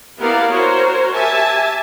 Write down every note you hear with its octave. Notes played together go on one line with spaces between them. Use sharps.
B3 E4 G4 A#4 D5 F5
F#4 A#4 C5 C#5
G4 E5 G#5 A5